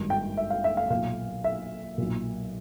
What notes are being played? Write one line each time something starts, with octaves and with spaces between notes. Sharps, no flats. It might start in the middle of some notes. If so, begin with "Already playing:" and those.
Already playing: G#1 G2 D#3
G5
E5
F5
E5
F5
B1 A#2 F5
E5
B1 A#2